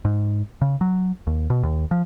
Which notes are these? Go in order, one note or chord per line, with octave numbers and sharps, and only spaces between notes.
G#2
C#3
F#3
D#2
B2
D#2
F3